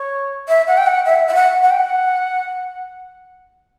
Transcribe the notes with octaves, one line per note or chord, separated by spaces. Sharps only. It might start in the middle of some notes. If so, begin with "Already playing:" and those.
Already playing: C#5
E5
F#5
G5
F#5
E5
E5
F#5
F#5
G5
F#5